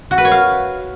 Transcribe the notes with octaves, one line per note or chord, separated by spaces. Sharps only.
F#4
B4
C#5
F5